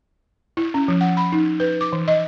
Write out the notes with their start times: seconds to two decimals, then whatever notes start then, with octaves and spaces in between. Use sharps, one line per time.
0.57 E4
0.74 C#4
0.88 F3
1.01 F#5
1.17 B5
1.32 D#4
1.60 B4
1.81 D6
1.93 E3
2.08 D#5